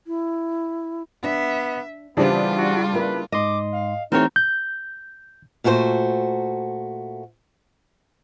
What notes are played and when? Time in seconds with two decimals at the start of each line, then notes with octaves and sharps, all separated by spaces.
0.07 E4
1.24 B3 D4 E5
2.17 C#3 E3 G3 B3 D4 F4 G4 C5
2.57 F#4
2.94 A#3 E4 A#4 B4
3.32 G#2 D#5 C6 D6
3.72 F5
4.12 E3 A3 C4 D#4 G4 C#5 F6
4.36 G6
5.64 A#2 A3 F#4 G#4 C5